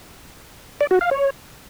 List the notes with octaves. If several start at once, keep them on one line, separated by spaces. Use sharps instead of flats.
D5
F#4
F5
C#5